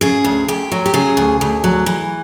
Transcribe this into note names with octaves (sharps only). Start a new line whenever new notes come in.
C#3 G#4
D2
D2 G4
F#3
G4
C#3 G#4
D2
D2
F#3
E3